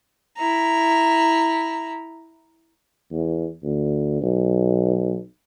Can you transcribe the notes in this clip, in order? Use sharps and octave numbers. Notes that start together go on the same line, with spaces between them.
E4 A#5
E2
D2
B1